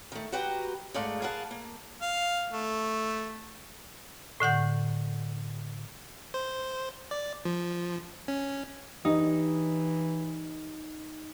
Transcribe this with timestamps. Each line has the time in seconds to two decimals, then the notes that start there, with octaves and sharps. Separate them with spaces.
0.12 D#3 A3
0.32 F#4 G4 B4 G5 A#5
0.94 G#2 G#3 A3 D5 F5
1.22 G#4 A#4 B4 F5 F#5 A5
1.51 A#3
2.02 F5
2.52 A3
4.40 A2 D3 F#5 G6
6.34 C5
7.11 D5
7.45 F3
8.28 C#4
9.05 E3 D#4 G4 C#5 D#5